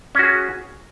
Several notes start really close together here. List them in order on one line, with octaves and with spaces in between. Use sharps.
C#4 F#4 G#4